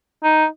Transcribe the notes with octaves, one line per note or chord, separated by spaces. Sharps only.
D#4